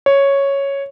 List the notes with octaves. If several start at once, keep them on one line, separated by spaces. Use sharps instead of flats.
C#5